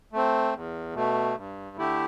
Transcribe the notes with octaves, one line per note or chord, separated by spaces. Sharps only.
A3 C4
E2
B2 A3
G2
D3 A3 E4 G4